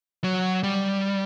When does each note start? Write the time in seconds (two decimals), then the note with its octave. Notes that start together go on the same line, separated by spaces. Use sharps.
0.24 F#3
0.63 G3